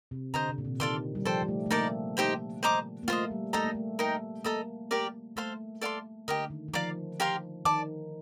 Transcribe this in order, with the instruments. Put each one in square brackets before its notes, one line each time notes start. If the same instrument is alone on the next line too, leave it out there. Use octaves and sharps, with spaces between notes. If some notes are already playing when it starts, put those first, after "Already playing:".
[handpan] C3
[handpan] D3 [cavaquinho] C5 D#5 A#5
[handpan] C3
A#2
C3
[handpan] D#3 [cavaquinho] A4 D5 F5 C6
[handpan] G3
[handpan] F3 [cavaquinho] A4 C5 G5
[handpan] G3
A3
A3
[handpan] A#3 [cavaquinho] D#4 A#4 D5 A5
[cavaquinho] D#4 G4 C5 G5
C5 D#5 A#5 D6
[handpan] A#3
[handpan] A3 [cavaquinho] F4 C5 D#5
[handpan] G3
[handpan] A3 [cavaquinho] D#4 A4 D#5 A#5
[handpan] A#3
A3
[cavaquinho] D#4 A#4 D#5 G5
[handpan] A#3 [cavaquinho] A4 D#5 A#5 D#6
[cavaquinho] G4 A#4 D5
[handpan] A3 [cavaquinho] A4 C5 F5 C6
[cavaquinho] A4 D5 F5 C6
[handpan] D3 [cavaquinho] G4 A#4 D#5
[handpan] D#3
D#3
[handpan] F3 [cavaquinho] D5 F5 A#5 D6
[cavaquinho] G4 A#4 F5 C6
[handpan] D#3 [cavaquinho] D5 A5 D6